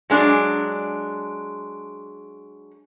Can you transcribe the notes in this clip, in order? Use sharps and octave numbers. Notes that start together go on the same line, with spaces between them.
F#3 G#3 D4